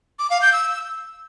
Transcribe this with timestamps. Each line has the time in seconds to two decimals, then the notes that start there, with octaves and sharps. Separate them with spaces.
0.19 D6
0.30 F5
0.42 G6
0.53 E6